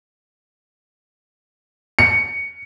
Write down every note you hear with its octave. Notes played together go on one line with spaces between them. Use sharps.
C#7